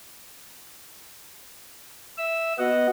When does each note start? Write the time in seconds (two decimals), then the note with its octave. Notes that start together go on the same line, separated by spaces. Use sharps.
2.18 E5 E6
2.59 B3 F#4 D#5 F#5